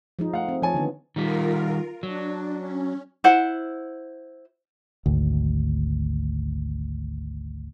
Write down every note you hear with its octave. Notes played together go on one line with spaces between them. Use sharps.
F3 G#3 D#4
A3 F5 F#5
C4
F3 C#5 G#5 A5
D3 D#3 B3
D#3 G3 F4 A#4
F#3 D4
C#4
E4 C5 F#5
G#1 D2